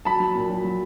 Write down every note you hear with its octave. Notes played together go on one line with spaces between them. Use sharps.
F#3 A5 B5
F#3
A#2
F#3
F#3